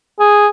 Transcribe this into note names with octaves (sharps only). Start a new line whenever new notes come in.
G#4